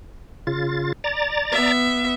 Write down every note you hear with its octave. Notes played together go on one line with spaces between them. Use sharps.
C#3 F4 A6
D5 A#5 A6
B3 E5